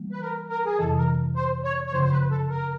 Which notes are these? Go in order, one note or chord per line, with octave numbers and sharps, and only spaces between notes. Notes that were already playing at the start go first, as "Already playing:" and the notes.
Already playing: E3 G3 A#3
B4
A#4
A#4
G#4
F2 C3 E3 A4
A#4
C5
C#5
C#5
F#2 C#3 F3 C5
C5
B4
A4
A#4